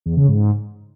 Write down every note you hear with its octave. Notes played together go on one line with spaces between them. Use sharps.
E2
C#3
G#2